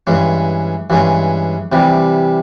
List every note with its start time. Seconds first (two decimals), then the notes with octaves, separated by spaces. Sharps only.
0.07 G2 E3 G#3 C#4
0.90 G2 E3 G#3 C#4
1.72 C3 E3 G3